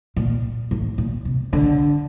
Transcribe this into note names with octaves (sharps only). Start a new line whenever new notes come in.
A#2
A2
A#2
C3
D3